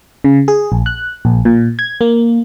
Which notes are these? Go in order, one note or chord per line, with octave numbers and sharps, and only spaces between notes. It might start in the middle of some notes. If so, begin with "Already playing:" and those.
C#3
G#4
A#1
F#6
A#1
A#2
G#6
A#3